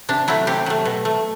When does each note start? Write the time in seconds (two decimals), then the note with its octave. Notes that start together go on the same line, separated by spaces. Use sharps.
0.09 C3 D4
0.28 F#3 A3 E4
0.47 C3 G4
0.66 F#3 A3
0.85 B2
1.05 A3